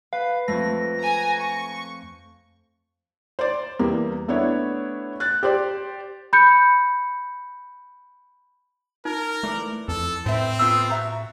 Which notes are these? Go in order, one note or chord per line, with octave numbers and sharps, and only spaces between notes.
B4 F5
F2 A3 A#6
G#5 A#5
C#6
C5 D5
E2 G3 A#3
A3 B3 D4 E4 C#5
F#6 A6
G4 C5 D5
B5 G6 C#7
D#4 A#4
E3 A3 D5
F2 A4
A2 C4 B4 E5
A3 B3 F4 E6
F#4 E5 A#5